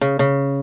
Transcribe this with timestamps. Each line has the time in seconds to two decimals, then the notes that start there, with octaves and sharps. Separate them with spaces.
0.01 C#3
0.19 C#3